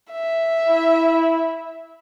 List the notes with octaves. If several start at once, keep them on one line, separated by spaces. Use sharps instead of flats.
E5
E4